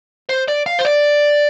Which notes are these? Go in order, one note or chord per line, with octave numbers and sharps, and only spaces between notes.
C5
D5
F5
C5
D5